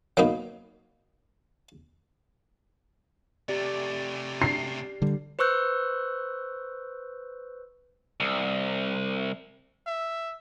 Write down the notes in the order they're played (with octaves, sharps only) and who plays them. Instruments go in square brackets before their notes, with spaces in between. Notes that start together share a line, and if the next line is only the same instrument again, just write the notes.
[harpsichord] F#3 A#3 B3 D#4
[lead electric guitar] C3 A3 [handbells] G4 D5
[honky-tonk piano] C7
[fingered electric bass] D3 G3
[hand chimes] B4 C5 C#6 E6 F#6 G6
[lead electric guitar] C2
[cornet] E5